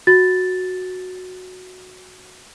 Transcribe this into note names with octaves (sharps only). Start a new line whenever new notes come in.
F#4 A6